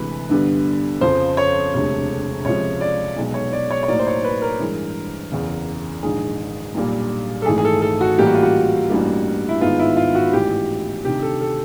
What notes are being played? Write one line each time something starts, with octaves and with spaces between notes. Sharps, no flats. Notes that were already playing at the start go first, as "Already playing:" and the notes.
Already playing: D2 C3 E3 G#3 B4
G2 D3 G3 B3
F2 C#3 F3 C5
C#5
E1 D2 C3
C#2 C3 F3 C#5
D5
B1 B2 G#3
C#5
D5
C#5
C#5
A2 F#3 A#3 D#4 D5
C5
C#5
B4
A#4
G2 E3 G#3
F#1 E2 C#3
A#1 G#2 D#3 G#4
B1 A#2 G3
A4
G#1 G#2 E3 A3 G#4
G#4
A4
A4
F#4
A1 A2 E3 G3 A#3 G4
F#4
F4
F#4
A1 G2 E3 G3 A#3
E4
G#1 G#2 D#3 G#3 B3 F4
E4
F4
F#4
A1 G#2 E3 G4
D2 C3 D#3 G4
A4
A4